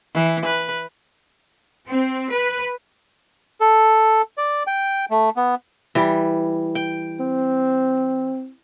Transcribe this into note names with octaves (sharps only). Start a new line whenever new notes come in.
E3
B4
C4
B4
A4
D5
G5
A3
B3
E3 G3
G5
C4